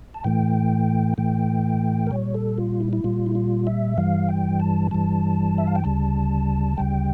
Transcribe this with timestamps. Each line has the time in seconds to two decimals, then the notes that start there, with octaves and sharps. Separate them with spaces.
0.14 A5
0.24 A2 E3 A3 G5
1.18 A2 E3 A3 G5
2.07 A#4
2.11 A#2 G3 C#5
2.34 A4
2.58 F4
2.81 E4
2.93 E4
3.04 A#2 G3 F4
3.26 E4
3.35 F4
3.67 E5
3.98 G2 E3 G3 F5
4.29 G5
4.60 A5
4.91 G2 E3 G3 A5
5.58 E5
5.67 F5
5.76 G5
5.84 D2 C#3 G3 A5
6.77 D2 C#3 G3 G5